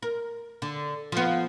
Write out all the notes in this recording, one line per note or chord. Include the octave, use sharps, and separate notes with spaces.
A#4
D3
F3 B3